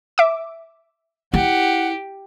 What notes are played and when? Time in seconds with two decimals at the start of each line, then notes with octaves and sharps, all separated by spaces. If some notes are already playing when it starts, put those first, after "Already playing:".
0.18 E5 D6
1.34 E4 G4 F#5